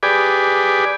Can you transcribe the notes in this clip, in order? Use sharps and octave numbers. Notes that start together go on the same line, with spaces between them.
G4 G#4 B4 D5